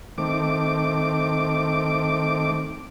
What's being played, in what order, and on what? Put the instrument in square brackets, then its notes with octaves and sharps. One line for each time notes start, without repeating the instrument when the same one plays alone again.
[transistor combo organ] D#3 A3 C4 D6